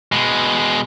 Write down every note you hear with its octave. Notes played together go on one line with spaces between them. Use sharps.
B2 G#3